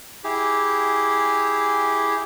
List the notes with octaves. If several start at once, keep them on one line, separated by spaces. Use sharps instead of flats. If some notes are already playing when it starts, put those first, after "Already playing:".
E4 G4 G#4